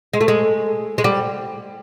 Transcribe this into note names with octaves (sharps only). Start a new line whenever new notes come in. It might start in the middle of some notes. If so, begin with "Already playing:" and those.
G#3
A3
G#3
G#3
G3